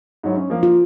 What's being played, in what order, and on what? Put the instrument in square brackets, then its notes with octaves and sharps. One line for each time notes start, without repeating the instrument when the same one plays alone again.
[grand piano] G#2 F#3 E4
C#4
F3 A#3
[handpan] F4